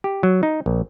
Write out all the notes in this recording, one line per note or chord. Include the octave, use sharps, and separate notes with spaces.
G4
F#3
D#4
A#1